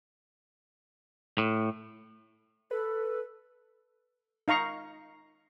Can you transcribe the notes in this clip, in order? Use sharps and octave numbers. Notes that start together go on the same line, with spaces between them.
A2
A4 B4
D#4 F5 A#5 C#6